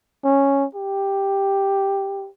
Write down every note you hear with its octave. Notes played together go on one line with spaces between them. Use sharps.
C#4
G4